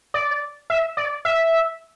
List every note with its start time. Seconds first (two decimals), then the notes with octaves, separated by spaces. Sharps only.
0.14 D5
0.70 E5
0.97 D5
1.25 E5